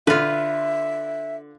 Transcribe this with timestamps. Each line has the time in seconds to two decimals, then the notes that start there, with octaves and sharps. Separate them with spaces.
0.07 D3 F4 B4 E5